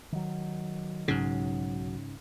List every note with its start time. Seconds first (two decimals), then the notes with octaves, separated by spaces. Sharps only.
0.12 D#3 F#3
1.08 B1 G#2 C#3 F#3